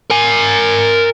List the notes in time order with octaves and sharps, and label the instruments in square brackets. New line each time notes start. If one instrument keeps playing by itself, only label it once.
[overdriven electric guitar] A#4 G#5